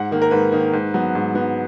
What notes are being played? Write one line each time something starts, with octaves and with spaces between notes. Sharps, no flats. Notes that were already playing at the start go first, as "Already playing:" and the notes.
Already playing: G#2 F#5
D#3 A#3
A#4
G#2 B4
D#3 A#3
G#2
F#3 B3
G#2
F#3 B3